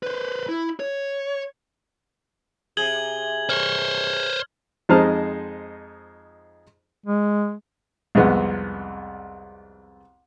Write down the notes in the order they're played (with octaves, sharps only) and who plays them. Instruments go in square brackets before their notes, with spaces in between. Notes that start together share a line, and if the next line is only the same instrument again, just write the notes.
[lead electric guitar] B4 C5
E4
C#5
[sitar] C3 G#4 [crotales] G#6 F#7 G7
[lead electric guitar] C5 C#5 [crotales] F6
[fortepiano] F2 G#3 D#4 C5 A5 F6
[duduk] G#3
[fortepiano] C2 F2 G#3 B3